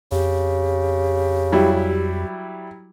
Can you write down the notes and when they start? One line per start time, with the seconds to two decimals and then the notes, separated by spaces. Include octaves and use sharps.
0.12 F2 C#3 G4
1.52 F#3 G3 E4